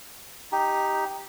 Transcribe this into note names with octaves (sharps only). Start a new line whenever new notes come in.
D#4 G4